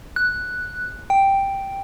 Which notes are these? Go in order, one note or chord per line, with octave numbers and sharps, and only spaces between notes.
F#6
G5